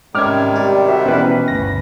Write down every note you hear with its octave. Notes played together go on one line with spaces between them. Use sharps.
G#2 C3 D#3 G3 C#4 D6 F6 G#6
G4 D5
F#4 C5 E5
B2 E3 C#4 B4
G1 D2 A#6